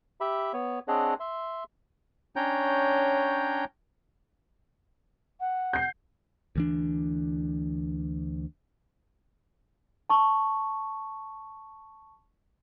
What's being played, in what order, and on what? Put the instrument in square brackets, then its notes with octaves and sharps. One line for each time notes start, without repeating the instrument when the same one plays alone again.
[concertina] G4 E5 B5
B3 C#5
C4 D4 G#4 C#5 D#5 F#5
E5 C6
[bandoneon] C#4 D4 C#5 G5 A#5 G6
[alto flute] F#5
[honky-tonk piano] G6 C7
[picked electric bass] D2 E3 D4
[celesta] A5 C#6